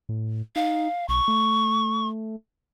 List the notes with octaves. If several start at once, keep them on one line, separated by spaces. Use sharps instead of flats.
A2
D#4 F5
B1 C#6
A3